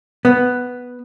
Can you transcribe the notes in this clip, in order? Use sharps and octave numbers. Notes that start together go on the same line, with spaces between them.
B3